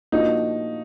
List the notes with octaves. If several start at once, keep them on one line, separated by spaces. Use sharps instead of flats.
A#2 F3 A#3 D4 D#4 F#4